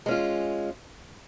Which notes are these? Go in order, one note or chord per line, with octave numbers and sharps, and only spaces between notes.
G#3 C#4 F4